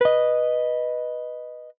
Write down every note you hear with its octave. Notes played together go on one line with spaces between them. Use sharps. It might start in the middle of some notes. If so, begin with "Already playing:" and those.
B4 D#5